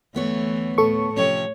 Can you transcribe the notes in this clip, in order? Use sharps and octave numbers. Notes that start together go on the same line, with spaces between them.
D2 E3 A3 B3 C#5
A2 A4 C#6
C3 F3 C#4 C#5